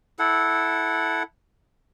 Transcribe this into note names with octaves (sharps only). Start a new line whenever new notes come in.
E4 A4 F#5